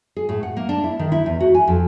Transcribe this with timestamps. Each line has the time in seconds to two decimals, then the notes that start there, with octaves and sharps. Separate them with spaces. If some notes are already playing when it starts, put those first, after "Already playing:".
0.16 G#4
0.29 A2
0.43 F#5
0.57 A#3
0.69 D4
0.84 E4
0.99 D#3
1.12 E4
1.26 E2
1.41 F#4
1.55 G#5
1.68 F2